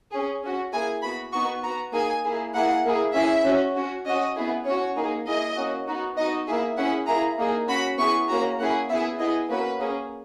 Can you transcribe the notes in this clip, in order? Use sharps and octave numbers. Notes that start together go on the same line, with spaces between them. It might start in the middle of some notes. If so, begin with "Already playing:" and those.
C#4 G#4
C#4 F#4
A#3 E4 G#4 G#5
B3 F#4 B5
B3 D#4 F#4 C#6
B3 F#4 A#5
A#3 D#4 G#4 G#5
A#3 E4 G#4
A#3 E4 G#4 F#5
A#3 E4 G#4
C#4 E4 G#4 E5
C#4 F#4
C#4 F#4
C#4 F#4 D#5
B3 E4 G#4
C#4 F#4 C#5
A#3 D#4 G#4
A#3 E4 G#4 D#5
A#3 C#4 F#4
B3 D#4 F#4
B3 D#4 F#4 D#5
A#3 E4 G#4 E5
C#4 E4 G#4 F#5
A#3 E4 G#4 A#5
A#3 D#4 G#4
C#4 F#4 B5
B3 E4 G#4 C#6
A#3 C#4 F#4 A#5
A#3 C#4 E4 G#4 F#5
B3 E4 G#4 E5
B3 E4 G#4 D#5
A#3 C#4 F#4 B4
A#3 C#4 G#4